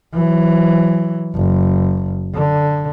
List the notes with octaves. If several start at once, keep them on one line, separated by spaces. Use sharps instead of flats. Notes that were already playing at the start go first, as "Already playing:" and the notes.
E3 F#3
F#1
D3